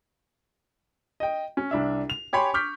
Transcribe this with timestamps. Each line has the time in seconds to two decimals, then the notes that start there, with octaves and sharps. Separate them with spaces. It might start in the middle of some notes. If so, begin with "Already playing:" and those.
1.20 D#5 G5
1.57 C#4
1.71 C2 D4 E5
2.10 F7
2.33 G4 C#5 G#5 B5 C6
2.54 C#6 D6 F6 G6 B6